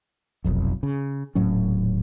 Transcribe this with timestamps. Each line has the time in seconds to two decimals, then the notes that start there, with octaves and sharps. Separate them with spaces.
0.44 F1 B1 F2
0.83 C#3
1.35 D#1 A2 F#3 C#4